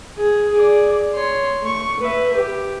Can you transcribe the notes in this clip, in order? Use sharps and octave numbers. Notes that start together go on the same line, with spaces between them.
G#4
G#4 D5
C#5 C6
A3 C#6
B4 E5
G4